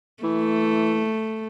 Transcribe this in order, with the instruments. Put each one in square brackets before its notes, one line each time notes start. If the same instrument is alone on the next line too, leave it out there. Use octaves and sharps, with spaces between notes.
[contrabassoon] E3 [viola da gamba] A3